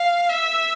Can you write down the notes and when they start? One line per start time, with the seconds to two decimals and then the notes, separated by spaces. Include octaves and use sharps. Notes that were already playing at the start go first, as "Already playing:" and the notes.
Already playing: F5
0.29 E5